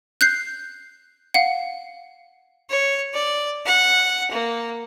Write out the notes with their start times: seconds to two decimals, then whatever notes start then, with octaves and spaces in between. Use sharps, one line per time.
0.21 F#6 G6 C7
1.34 F5 F#5
2.70 C#5
3.14 D5
3.66 F#5
4.32 A#3